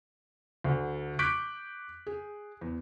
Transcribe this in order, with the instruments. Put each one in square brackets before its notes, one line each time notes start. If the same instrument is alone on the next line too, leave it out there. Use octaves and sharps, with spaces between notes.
[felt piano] D2 D3
C#6 D6 F#6 G6 B6 D7
G#4
E2